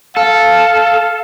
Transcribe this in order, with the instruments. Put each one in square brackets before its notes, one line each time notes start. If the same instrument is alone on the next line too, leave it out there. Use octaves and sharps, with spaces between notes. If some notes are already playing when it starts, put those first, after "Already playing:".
[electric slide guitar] A4 [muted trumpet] F5